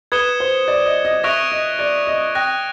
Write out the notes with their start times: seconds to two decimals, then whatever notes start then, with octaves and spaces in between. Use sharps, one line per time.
0.12 B4 D#6 G#6 C#7 E7 G7
0.40 C5
0.68 D5
0.86 D#5
1.05 D#5
1.24 E5 C#6 F#6 A#6 D7 F7
1.52 D#5
1.79 D5
2.07 D#5
2.35 G5 D#6 F#6 A#6